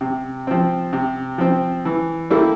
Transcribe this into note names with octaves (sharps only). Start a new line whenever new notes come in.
C3
F3 C4
C3
F3 C4
E3
G3 A#3 E4 A4